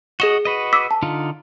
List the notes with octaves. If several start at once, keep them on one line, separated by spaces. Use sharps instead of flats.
F#4 G#4 D#5 E7 G7
F#4 B4 D#5
D6 E6 B6
A5
D3 D#4 F4